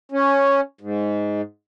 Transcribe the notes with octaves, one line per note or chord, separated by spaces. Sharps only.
C#4
G#2